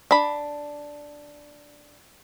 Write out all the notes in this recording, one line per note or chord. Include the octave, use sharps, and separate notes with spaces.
D4 B5